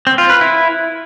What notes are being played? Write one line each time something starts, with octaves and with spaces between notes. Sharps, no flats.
C4
F4
B4
E4